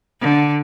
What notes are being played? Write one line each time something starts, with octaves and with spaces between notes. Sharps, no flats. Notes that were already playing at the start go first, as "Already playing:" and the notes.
D3